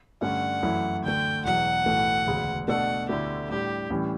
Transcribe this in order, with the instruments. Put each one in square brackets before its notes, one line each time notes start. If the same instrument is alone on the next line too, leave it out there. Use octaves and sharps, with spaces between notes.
[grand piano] G2 D3 A3 C#4 [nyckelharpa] F#5
[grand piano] F#2 E3 A3 E4
[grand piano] D2 D3 A3 [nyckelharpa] G5
[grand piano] E1 E2 B2 F#3 [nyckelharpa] F#5
[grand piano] B1 A2 E3 A3
E1 D2 C#3
[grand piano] B2 A3 D4 A4 [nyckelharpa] F#5
[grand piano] D2 D3 A3 E4 [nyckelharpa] G4
[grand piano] A2 G3 D4 [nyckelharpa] G4
[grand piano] A2 E3 G3 C#4